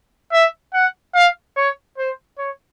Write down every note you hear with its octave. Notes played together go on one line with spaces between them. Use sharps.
E5
F#5
F5
C#5
C5
C#5